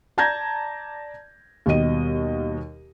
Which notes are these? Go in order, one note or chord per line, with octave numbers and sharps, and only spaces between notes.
D5 A5 A#5 G6 G#6 A#6
D#2 B2 G3 G4 D#5 D#7